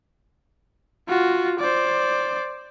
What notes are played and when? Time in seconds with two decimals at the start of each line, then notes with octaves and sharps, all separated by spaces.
1.09 F4 F#4
1.60 C5 D5